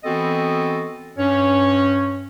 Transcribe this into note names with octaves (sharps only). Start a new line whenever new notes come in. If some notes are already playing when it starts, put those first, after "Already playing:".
E3 B3 C4 F#4 A4 D#5
G2 C#4 C#5